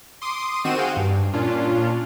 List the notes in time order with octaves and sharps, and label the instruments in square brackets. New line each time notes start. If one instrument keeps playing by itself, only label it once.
[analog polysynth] C6 D6 D#6
D#3 C4 F#4 D#7 E7
F#4 G#4 F5 G5
G2
A#2 C#4 D4 F4